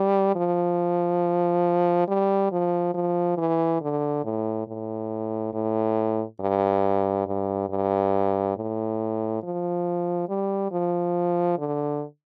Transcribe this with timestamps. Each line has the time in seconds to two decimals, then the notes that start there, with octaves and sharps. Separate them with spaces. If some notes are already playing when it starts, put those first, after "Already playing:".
Already playing: G3
0.36 F3
2.08 G3
2.52 F3
2.94 F3
3.37 E3
3.81 D3
4.24 A2
4.68 A2
5.54 A2
6.40 G2
7.27 G2
7.70 G2
8.57 A2
9.43 F3
10.29 G3
10.72 F3
11.58 D3